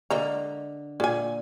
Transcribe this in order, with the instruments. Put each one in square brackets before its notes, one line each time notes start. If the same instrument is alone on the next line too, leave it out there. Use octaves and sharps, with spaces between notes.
[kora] D3 [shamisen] G#3 A#3 A#5
[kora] A#2 [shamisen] G#4 G#5